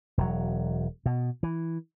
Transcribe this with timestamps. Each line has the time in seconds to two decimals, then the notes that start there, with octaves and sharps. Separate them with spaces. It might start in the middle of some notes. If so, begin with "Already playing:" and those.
0.18 E1 F#3
1.06 B2
1.43 E3